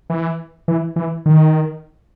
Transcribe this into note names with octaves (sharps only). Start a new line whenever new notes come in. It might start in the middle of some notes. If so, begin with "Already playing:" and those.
E3
E3
E3
D#3